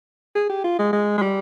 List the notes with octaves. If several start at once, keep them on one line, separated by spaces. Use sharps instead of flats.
G#4
G4
F4
G#3
G#3
G#3
G3